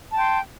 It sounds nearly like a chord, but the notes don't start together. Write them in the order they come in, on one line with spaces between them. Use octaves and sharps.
A5 G5 C6